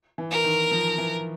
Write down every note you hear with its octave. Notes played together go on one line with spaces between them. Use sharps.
E3
A#4
D#3
F3
E3